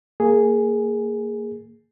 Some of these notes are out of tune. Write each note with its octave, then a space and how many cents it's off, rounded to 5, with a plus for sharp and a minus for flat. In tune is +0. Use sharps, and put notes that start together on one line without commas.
A#3 -15 G#4 +0